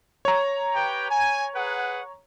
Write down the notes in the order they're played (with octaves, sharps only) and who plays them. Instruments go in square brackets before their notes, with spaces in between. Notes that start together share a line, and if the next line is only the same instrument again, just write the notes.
[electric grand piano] C#5 A#5
[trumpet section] G4 B4 G5
G#5
G#4 B4 F#5